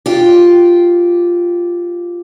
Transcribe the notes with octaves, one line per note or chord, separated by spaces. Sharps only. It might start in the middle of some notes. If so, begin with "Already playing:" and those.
F4 G4